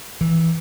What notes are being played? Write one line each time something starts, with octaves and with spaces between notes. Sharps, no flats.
E3